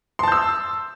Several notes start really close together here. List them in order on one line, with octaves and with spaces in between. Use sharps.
C6 A5 G6 E6